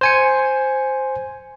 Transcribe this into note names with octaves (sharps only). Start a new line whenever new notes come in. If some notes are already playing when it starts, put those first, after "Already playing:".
C5 G#5 C#7